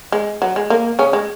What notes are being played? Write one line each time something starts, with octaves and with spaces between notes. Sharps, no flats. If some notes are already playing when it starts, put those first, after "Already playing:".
G#3
F#3
G#3
A#3
C#3 C#4
G#3